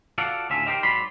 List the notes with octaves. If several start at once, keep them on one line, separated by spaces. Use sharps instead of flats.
F4 F#4 A4 D5 F5 F#5
D2 A2 C#4 F4 E5
D#4 G4 A#4 C5
G#2 F#3 C#5 D5 B5 C6